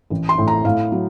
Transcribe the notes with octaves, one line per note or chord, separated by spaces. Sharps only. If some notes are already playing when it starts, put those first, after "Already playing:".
A1
C6
A2
A#5
A2 F5
F#3